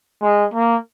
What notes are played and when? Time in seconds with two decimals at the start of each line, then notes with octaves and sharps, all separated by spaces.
0.22 G#3
0.54 A#3